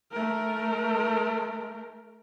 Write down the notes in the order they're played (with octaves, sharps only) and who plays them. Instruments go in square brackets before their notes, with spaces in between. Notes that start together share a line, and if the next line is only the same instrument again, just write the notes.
[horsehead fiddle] A3 A#4